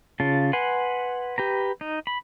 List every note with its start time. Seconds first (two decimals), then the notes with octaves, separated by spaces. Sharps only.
0.20 C#3 F4 A5
0.53 B4 F#5 G#5 C6
1.38 G4 B4 A#5
1.81 D#4
2.07 B5